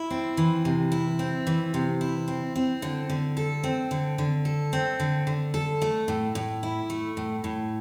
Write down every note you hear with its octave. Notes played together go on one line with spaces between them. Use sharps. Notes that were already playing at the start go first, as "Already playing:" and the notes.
Already playing: E4
C4
E3
C3
E4
C4
E3
C3
E4
C4
C4
D3
D3
A4
C4
D3
D3
A4
C4
D3
D3
A4
A3
A2
A2
E4
A3
A2
A2